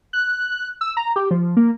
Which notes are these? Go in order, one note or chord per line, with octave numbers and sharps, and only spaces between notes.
F#6
E6
A#5
G4
F3
A#3